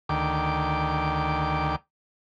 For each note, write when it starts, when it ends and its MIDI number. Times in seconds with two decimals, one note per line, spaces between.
0.09 1.76 38
0.09 1.76 51
0.09 1.76 79
0.09 1.76 86